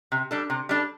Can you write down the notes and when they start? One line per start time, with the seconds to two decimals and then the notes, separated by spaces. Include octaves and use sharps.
0.12 C3
0.31 G3 D4 A4
0.50 C3
0.69 G3 D4 A4